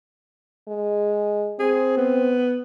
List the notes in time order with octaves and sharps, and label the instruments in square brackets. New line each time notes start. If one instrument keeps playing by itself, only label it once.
[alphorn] G#3
[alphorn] C4 [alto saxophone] G#4
[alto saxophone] B3